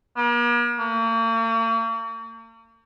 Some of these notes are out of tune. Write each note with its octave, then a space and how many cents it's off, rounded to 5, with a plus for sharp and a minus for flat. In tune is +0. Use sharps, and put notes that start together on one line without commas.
A#3 +45
A#3 -45